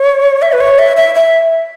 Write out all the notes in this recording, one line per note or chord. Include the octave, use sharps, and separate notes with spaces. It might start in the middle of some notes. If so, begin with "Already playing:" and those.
Already playing: C#5
E5
B4
C#5
E5
E5
E5